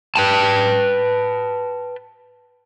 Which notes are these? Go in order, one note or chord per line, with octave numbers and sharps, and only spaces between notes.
B4 G5 A5